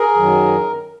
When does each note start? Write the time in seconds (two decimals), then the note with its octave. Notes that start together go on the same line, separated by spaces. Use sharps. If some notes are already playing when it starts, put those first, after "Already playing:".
Already playing: G#4 A#4
0.15 F#2 D#3 F#3